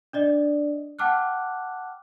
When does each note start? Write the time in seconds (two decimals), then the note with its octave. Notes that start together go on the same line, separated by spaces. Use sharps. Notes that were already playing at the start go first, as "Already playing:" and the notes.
0.13 D4 D5 D#5
0.99 F#5 G5 A5 D6 F6 F#6